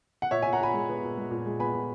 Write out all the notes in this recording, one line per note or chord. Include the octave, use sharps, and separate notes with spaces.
F#5
A#2 C#5 E5
A#2 E5 G#5
F#5 A#5
A#2 G#5 B5
G#3
B3
A#2
G#3
A#2
G#3
B3 G#5 B5
A#2